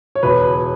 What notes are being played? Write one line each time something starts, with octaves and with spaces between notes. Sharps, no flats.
C#5
E1 B4